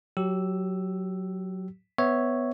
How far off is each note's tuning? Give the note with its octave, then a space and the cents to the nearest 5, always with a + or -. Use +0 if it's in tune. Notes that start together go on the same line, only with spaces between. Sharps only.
F#3 +0 G4 -20 E6 +0
B3 +15 C#5 +0 E5 -5